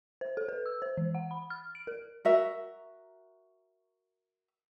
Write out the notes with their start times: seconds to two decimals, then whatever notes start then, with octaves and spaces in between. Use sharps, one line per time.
0.21 C5
0.37 A4
0.49 B4
0.66 E6
0.82 C5
0.97 E3
1.15 F#5
1.31 B5
1.50 F6
1.75 D7
1.87 A#4
2.25 F#4 A#4 E5